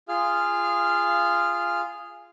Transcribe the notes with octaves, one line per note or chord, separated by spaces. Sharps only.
F4 G#4 F5 F6